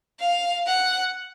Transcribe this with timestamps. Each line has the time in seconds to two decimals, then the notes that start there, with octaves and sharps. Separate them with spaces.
0.20 F5
0.67 F#5